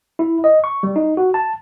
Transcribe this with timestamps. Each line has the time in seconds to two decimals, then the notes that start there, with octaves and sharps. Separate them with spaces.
0.19 E4
0.44 D#5
0.64 C#6
0.83 G3
0.96 D#4
1.17 F#4
1.34 A5